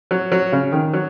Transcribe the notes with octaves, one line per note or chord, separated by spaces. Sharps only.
F#3
F#3
C#3
D#3
F#3